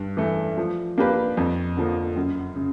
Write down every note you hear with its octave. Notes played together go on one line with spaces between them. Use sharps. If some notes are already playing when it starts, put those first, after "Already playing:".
Already playing: G2
E3 A3
F3
A#3 D4 G4 B4
F2
D3 F3 A#3
F#2
C#3